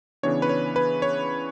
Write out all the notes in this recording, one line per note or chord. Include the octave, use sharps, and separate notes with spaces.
C#3 E3 B3 D4 C#5
B4
C#5
B4
C#5